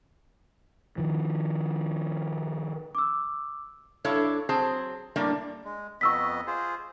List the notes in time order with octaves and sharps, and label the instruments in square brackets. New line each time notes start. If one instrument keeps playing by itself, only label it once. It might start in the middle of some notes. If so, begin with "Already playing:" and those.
[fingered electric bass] D#3 F3
[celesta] D6 E6
[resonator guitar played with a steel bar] G2 D4 E4 A4 C#5 F5
F#3 C4 G#4 C5 A5
A2 G3 A#3 D4 A#4 D5
[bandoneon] G#3
[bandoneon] F2 B3 D#5 [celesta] C#6 E6 B6
[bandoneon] F4 G#4 C5